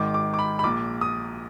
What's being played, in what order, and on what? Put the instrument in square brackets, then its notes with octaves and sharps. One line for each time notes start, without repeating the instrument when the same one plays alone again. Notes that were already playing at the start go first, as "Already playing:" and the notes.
Already playing: [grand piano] G#1 G#2 D#3 D6
D6
D6
B5
B5
A#1 A#2 D6
D#6